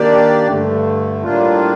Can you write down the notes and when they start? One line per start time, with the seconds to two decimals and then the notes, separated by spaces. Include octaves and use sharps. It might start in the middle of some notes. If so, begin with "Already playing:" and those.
Already playing: D#3 A#3 D4 G4 D5
0.48 G2 D3 A3
1.23 A2 G3 A#3 D4 F4